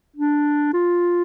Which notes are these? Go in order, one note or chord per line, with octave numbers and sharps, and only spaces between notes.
D4
F4